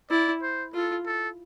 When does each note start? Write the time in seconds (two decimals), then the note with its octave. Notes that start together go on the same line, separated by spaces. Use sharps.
0.11 E4 D5
0.42 C5
0.74 F4 A4
1.06 A4